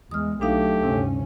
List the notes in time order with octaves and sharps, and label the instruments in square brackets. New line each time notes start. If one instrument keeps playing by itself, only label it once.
[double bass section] E2 G#3 [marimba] D#6 F6
[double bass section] B1 F#3 [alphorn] A3 [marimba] D4 D#4 F5 [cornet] G4
[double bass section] D2 G2 C#4 [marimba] C3